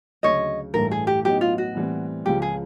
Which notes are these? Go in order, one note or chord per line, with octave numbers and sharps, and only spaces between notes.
D2 C#3 F#3 C#5 D#5
A1 G2 E3 A3 A#4
G#4
G4
A2 F#3 B3 D#4 G4
F4
F#4
A2 E3 G3 C4
C#2 C#3 F3 G4
G#4